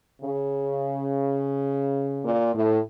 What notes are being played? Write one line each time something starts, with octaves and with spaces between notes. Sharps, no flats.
C#3
A#2
A2